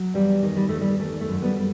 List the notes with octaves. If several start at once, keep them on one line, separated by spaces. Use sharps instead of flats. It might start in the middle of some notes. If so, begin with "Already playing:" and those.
Already playing: F#3
E2 G3
D#3
G3
E2 A3
G3
D#3 A3
A3
F#2
G3 B3
G3